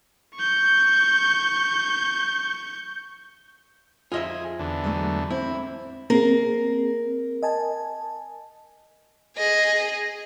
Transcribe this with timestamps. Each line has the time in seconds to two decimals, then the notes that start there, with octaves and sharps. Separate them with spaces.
0.36 C#6 G6
4.12 F2 F4 G#4 D#5 E5
4.59 E2 D3
4.84 F#3 G#3 A3
5.30 C4 E4
6.10 A#3 C4 G#4 A#4
7.43 D#5 G#5 A5
9.37 G#4 D#5